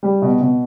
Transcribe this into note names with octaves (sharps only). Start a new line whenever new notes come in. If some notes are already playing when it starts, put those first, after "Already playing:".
G3
B2
B2